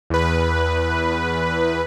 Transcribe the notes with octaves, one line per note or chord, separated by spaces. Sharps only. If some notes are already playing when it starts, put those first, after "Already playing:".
E2 B4